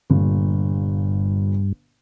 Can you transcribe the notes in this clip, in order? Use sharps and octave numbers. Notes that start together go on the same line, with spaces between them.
G1 G2 A#2